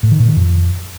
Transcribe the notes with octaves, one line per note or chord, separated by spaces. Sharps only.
A2
D#3
A#2
D#3
F2